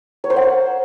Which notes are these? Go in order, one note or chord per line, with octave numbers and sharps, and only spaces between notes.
C#5
C5
F#5
F5